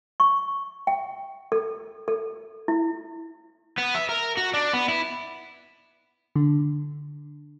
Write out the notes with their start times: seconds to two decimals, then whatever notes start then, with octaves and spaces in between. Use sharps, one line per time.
0.20 C#6
0.87 G5
1.52 A4
2.08 A4
2.68 E4
3.78 B3
3.95 E5
4.09 A#4
4.37 F#4
4.54 D4
4.73 B3
4.88 E4
6.36 D3